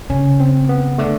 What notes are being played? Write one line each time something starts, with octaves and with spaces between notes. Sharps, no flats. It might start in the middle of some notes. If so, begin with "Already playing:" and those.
C#3 C#4
C4
B3
D3 A3